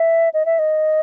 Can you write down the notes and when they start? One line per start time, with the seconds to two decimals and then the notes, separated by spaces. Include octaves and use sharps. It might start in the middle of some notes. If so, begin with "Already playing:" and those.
Already playing: E5
0.34 D#5
0.45 E5
0.59 D#5